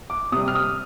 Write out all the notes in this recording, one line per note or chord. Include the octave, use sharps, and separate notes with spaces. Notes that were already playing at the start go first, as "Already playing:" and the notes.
D6
C3 G3 D#6
F6
D#6